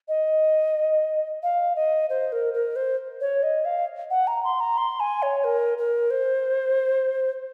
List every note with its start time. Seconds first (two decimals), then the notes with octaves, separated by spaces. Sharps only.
0.08 D#5
1.43 F5
1.76 D#5
2.09 C5
2.32 A#4
2.54 A#4
2.76 C5
3.21 C#5
3.43 D#5
3.65 F5
4.10 F#5
4.27 A#5
4.44 C6
4.60 A#5
4.78 C6
5.00 G#5
5.22 C#5
5.44 A#4
5.78 A#4
6.10 C5